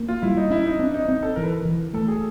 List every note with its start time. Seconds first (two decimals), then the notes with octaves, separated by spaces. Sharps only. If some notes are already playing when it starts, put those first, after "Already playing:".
Already playing: A#3
0.08 F4
0.22 G3 E4
0.37 D#4
0.50 C#4 E4
0.66 D#4
0.79 C4 D4
0.94 D#4
1.08 C4 D#4
1.23 A4
1.36 E3 A#4
1.43 B4
1.51 A#4
1.65 E3
1.93 A3 A4
2.08 G#4